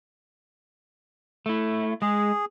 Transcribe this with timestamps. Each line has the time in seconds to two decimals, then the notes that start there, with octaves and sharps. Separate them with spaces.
1.46 A3 E4
2.02 G#3 G#4